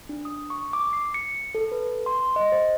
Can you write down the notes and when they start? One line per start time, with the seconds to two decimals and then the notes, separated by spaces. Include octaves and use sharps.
0.09 D4
0.25 D#6
0.50 C#6
0.73 D6
0.93 C7
1.14 C#7
1.55 A4
1.72 B4
2.06 C6
2.36 D#5
2.52 C5